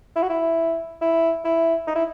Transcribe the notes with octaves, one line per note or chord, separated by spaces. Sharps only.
E4
F#4
E4
E4
E4
D#4
E4